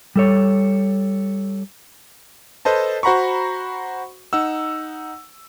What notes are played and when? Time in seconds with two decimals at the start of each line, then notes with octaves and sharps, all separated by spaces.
0.16 G3 A4 C#5
2.65 A4 B4 C5 D#5 A5
3.03 F#4 C5 F#5 A#5 B5 C#6
4.33 D#4 F#5 E6